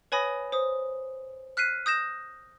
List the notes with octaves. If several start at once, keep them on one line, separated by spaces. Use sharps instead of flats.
B4 C#5 G#5 B5 D#6 A#6
C5 D#6
F6 F#6 B6 C7 D#7
D#6 G6 A#6 E7